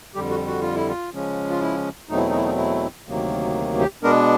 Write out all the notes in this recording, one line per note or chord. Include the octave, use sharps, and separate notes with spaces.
F2 D3 G3 G4
F#4
F#4
F4
E4
F4
C#3 F3 G#3 C#4
F4
E4
E2 B2 F#3 A3 C4 D#4
E4
D#4
E4
D#4
E4
D2 C3 D#3 F#3 A#3
G4
B2 G#3 B3 D4 A#4